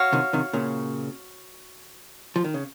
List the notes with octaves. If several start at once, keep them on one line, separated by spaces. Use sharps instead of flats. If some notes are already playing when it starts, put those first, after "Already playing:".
Already playing: F#4 C#5 F5
C3 D#3
C3 D#3
A#2 C#3
F3
D#3
C#3